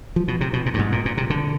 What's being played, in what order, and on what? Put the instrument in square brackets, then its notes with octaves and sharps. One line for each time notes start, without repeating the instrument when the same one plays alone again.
[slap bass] F3
B2
C3
B2
A#2
G2
G#2
A#2
A#2
C3
D3